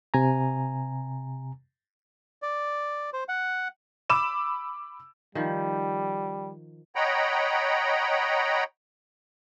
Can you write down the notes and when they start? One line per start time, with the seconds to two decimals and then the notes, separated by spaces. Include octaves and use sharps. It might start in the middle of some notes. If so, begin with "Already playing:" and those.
0.14 C3 G#5 A#5
2.42 D5
3.13 C5
3.29 F#5
4.10 B5 D6 E6 E7
5.35 D#3 F3 G3
6.96 C#5 D#5 F#5 G5 A#5 B5